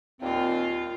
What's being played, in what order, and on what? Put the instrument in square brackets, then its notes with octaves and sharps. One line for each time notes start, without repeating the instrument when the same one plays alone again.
[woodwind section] D#2 A#2 C4 [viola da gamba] F4